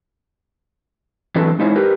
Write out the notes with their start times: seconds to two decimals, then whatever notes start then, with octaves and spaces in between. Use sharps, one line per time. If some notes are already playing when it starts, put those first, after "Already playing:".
1.35 E3 F#3 C4 D4 A4 B4
1.59 G#3 D#4 E4 C5 C#5
1.76 G4 A#4 B4